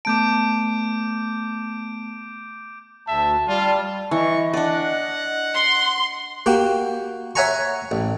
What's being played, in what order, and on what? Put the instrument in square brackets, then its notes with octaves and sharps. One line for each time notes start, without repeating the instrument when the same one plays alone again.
[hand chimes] A3 B3 A5 [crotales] D6 G6 D7
[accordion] D2 [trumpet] E5 [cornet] A5
[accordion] G3 [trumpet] F4
[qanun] E3 [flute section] D#5 [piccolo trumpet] C#6
[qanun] D4 D5 [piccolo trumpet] F#5
[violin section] C6
[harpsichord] A#3 F#4 G4
C#5 E5 F#5 G#5 A#5 C#6
A1